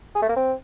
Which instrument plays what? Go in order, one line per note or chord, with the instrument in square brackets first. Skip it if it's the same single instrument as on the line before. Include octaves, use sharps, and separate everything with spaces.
[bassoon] G#4
A3
A#3
C4